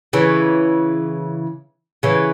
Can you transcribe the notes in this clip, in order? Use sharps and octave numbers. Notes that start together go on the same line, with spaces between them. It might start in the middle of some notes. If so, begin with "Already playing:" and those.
C#3 E3
C#3 E3